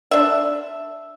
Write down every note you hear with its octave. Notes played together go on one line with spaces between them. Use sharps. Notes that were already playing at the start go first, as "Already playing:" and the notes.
D4 E5